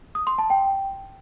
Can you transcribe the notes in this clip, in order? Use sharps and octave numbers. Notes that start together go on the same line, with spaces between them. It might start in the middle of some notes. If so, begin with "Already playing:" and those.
D#6
C6
A5
G5